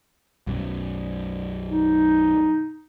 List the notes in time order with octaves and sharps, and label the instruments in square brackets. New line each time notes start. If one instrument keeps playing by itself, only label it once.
[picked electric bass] B1 F#2
[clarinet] D#4